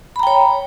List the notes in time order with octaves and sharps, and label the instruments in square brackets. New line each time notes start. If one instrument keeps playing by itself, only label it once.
[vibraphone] B5
A#5
G5
C#5